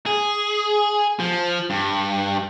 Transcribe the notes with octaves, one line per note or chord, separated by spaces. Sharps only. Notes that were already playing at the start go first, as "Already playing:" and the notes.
G#4
F3
G2